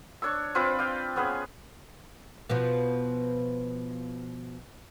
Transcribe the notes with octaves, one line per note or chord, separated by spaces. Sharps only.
D4 C#5 C#6 E6
C4 F4 B4 D6
D5 F5 G5
B3 C#4 G#4 B4
B2 F3 B3